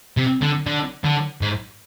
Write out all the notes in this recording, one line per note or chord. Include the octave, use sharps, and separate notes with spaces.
C3
D3
D3
D3
G#2